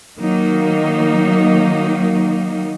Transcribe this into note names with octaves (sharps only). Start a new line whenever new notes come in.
D#3 F#3 A#3 D#4